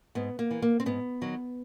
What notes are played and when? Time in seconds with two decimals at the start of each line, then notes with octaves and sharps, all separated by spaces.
0.15 G#2 B3
0.39 A#3
0.51 E3
0.62 A#3
0.80 C4
0.86 G#2 B3
1.21 D#3 F#3